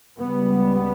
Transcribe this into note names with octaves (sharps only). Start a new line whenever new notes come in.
C#2 C#3 G3 B3